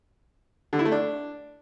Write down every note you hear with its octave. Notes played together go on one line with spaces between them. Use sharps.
D3
E4
A3
D4